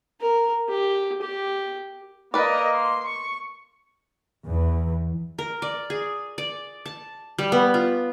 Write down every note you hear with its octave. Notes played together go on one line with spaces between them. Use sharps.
A#4
G4
G4
A#3 A#4 B4 D5 D#5
C6
C#6
E2 E3
A#4
D5
G#4
D5
A5
G3
B3
F4